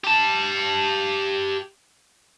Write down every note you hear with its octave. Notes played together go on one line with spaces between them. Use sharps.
G4 A5